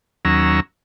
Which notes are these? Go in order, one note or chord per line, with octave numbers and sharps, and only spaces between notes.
D#2 F#3 C#4 A#5 E6